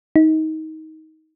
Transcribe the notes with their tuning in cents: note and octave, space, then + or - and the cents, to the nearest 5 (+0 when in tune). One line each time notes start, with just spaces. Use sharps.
D#4 +20